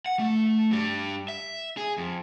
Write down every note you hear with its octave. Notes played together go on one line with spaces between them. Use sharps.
F#5
A3
G2 G3
E5
G#4
F2